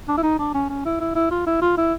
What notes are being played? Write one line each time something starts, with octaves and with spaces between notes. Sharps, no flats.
D4
E4
D#4
D4
C#4
C#4
E4
E4
E4
F4
E4
F4
E4